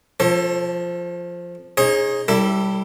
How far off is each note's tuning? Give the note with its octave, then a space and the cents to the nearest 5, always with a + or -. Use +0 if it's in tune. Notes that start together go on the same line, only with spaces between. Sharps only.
F3 +0 A4 +15 C#5 -45
D#4 +5 G#4 +0 C#5 -45
G3 -10 E4 +0 A4 +30